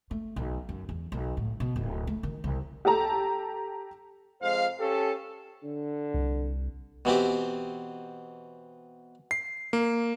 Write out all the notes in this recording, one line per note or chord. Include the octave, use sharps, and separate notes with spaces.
A3
B1
F#2
E2
B1
A2
B2
D1
A3
D#3
C2
G4 A4 A5 A#5
F2 G#3 C5 F5
C#4 G4 A4
D3
C2
B2 E3 C4 G4
C7
A#3